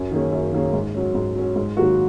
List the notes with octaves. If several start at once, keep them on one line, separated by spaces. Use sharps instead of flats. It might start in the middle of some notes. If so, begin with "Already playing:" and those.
Already playing: F#2
D#3 A#3 C#4 G#4
F#2
D#3 A#3 C#4 G#4
G#2
F#3 C#4
G#2
F#3 C#4
G#2
D#3 F#3 A#3 F#4